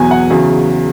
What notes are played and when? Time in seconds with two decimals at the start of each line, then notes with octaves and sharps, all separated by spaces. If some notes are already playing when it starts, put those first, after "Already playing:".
Already playing: E2 B2 F#3 G#5
0.11 F#5
0.30 E2 C#3 F#3